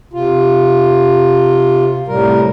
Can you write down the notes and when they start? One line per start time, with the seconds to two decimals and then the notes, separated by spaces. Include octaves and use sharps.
0.13 C3 F4
2.08 A2 C3 G3 A#4